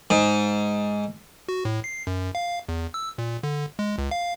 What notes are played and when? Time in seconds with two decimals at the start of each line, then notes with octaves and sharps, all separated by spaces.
0.10 G#2
1.49 F#4
1.65 A2
1.84 C7
2.07 F#2
2.35 F5
2.69 E2
2.94 E6
3.18 A#2
3.43 D3
3.79 G#3
3.98 C#2
4.11 F5